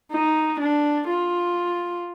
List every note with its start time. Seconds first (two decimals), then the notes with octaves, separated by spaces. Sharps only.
0.12 D#4
0.60 D4
1.09 F4